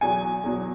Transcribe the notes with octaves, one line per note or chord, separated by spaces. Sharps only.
E2 B2 F#3 G#5
E2 B2 F#3